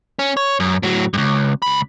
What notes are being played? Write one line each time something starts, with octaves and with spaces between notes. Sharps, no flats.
C#4
C#5
F#2
A2 F#3
C#2 G2
C#2 B5